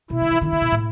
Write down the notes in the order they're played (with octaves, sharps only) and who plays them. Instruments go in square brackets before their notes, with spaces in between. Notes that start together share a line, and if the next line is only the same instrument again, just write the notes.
[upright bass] B2 [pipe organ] E4
[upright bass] D3
E3
[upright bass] D3 [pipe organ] E4
[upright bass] D3
B2
A2